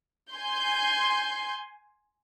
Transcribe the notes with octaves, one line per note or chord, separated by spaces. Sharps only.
G#5 C6 G6